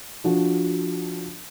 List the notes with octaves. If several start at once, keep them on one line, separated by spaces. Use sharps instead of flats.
F3 D4 F#4